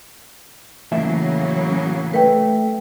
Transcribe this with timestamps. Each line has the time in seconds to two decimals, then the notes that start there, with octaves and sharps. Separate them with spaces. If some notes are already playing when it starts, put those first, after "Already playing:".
0.92 A2 C#3 E3 F#3 A#3 E5
2.14 A3 B4 G5